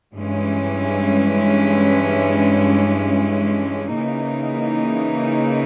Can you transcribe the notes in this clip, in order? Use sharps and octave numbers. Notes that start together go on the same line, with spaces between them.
G2 E3 G#3 C#4
C#3 E3 A#3 D#4